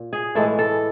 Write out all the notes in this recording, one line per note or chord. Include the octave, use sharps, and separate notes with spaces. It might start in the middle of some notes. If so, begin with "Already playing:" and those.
Already playing: A#2
G#4
A2 E3 G#3 A4
A4